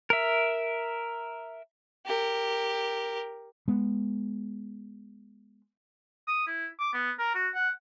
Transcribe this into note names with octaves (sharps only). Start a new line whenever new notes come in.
A#4 E5
G4 A#4
G#3 B3
D#6
E4
D6
B3
A#4
F#4
F#5